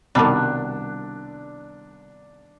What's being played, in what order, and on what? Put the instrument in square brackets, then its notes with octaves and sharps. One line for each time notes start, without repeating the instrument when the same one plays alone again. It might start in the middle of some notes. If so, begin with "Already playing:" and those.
[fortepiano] C2 B2 A5 [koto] D#3 G3 [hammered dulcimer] D4